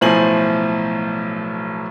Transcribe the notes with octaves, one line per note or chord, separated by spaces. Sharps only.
B1 A2 F3 C5 G#5 F#7